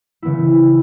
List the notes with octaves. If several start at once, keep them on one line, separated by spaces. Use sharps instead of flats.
C#3 E3 B3 E4